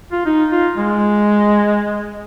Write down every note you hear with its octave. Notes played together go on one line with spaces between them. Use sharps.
F4
D#4
F4
G#3